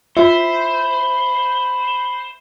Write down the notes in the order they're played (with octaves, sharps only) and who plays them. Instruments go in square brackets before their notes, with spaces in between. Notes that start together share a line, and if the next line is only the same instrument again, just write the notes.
[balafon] F4 [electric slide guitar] C5 [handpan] E5 [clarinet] B5